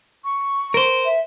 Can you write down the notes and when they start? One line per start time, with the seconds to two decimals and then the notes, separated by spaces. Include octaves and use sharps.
0.24 C#6
0.74 A#4 C5
1.05 E5